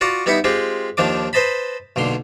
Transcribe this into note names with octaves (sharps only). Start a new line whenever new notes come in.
F4 F#4 D5 F#5 A#5
G3 B3 D#4 E4 F#5 B5
G#3 C4 F4 G4
D#2 D#3 F3 D4 D6
B4 C5 D#5 A5 B5
B1 A#2 D3 C6